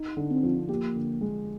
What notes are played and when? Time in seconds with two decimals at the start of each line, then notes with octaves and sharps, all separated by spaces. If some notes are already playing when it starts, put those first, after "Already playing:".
Already playing: D#4
0.17 D3
0.31 C4
0.43 F3
0.69 A#3 G4
0.96 D3
1.21 G#3